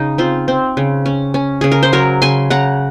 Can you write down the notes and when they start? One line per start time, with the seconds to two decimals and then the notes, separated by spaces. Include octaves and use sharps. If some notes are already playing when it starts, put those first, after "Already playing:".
Already playing: C#3 D#4
0.18 C4 F4
0.48 C4
0.77 C#3
1.06 C#4
1.34 C#4
1.61 C#3 G#4
1.72 A#4
1.83 C5
1.93 F#3 A#4 C#5
2.22 C#3 G#5 C6
2.50 C#3 F#5 A#5